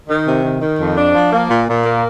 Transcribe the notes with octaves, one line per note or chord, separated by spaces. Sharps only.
D#3
C3
D#3
D#3
F2
D4
F3
A#3
A#2
A#2
A#3